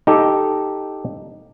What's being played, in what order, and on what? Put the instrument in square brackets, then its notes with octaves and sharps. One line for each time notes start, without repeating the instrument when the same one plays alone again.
[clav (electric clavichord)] D#4 G4 A4